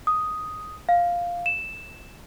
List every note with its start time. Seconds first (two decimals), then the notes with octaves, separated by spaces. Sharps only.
0.07 D#6
0.89 F5
1.46 E7